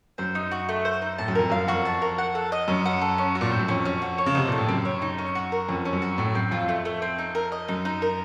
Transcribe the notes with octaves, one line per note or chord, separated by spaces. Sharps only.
F#2 C5
D#4
F#4
A3
C5
D#4
A2 A5
F#2
F2 A#4
F#2 F5
F2 F#4
A5
A#4
F#5
A4
D#5
F#2 C#4
F#5
A4
C#4
F#4
A#2
A2 C5
F#2
F2 C#4
C#4
F#4
C#5
C#3
C3 D#4
A#2 A4
A2
F#2 C4
C#5
D#4
C#4
F#4
A#4
F2 C#4
C#4
F#2
F#4
A2 A3
F#2 C4
F2 F4
A3
A3
C4
D#4
A#4
D#5
F#2 D#4
D#4
A#4